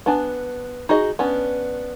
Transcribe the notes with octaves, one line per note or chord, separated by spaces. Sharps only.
B3 D4 G#5
D#4 F#4 G#4 D#5
B3 C#4 D4